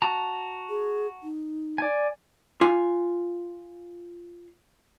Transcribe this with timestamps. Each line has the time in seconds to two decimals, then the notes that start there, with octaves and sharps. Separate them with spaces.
0.02 F#4 A5 A#5
0.69 G#4
1.23 D#4
1.78 D5 G#5
2.61 F4 G#5